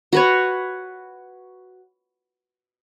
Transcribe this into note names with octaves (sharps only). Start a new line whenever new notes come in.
F#4 B4 C#5